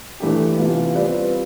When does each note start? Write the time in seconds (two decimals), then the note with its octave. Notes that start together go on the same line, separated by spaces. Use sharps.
0.20 E3 A3 D4 G4
0.58 C3 E3 B3 F4
0.95 G3 C4 F4 B4 D5